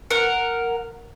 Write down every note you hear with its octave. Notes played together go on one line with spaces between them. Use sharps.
A#4 F#5